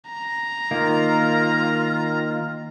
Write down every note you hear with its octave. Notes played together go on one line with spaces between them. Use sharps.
A#5
D#3 A#3 F4